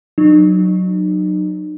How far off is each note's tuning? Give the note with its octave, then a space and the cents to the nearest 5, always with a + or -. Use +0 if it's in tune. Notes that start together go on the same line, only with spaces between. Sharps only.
F#3 +0 D#4 -40